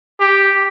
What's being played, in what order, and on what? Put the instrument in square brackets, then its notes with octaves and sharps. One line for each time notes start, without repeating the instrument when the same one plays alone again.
[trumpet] G4